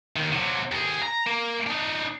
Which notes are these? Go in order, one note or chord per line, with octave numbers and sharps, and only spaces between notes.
D#2 D#3
C3 F#3
D#2 G#4
A#5
A#3
D4 D#4